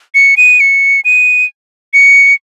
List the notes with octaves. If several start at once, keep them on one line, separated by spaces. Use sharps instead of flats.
C#7
D#7
C#7
D#7
C#7